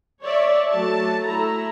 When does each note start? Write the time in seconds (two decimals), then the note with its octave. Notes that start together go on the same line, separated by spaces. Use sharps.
0.23 C#5 D5 E5
0.72 F#3 A3 A5
1.27 A3 E4 A4 A#5